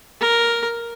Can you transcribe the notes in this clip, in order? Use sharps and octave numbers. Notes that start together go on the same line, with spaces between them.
A#4